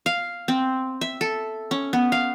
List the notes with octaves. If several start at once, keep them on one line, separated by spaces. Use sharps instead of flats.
F5
C4
E5
A4
C#4
B3
F5